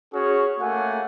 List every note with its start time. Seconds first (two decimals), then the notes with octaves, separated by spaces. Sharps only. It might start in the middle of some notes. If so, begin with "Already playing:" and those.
0.14 C#4 F#4 G#4 C#5
0.60 A3 A#3 F#5 G#5